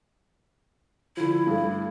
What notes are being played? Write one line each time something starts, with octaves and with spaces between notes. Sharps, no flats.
D3 F3 E4
G2 A3